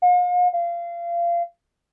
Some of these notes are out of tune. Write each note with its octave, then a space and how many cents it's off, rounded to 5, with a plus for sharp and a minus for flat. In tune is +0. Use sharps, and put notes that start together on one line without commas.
F5 +45
F5 -25